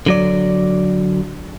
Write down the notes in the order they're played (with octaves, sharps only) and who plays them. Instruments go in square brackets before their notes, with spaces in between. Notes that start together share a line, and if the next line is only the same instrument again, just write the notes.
[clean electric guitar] D3 F#3 D5